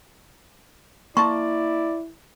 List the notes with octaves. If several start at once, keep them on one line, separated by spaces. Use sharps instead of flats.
A#3 E4 D5 A5 C6 C#6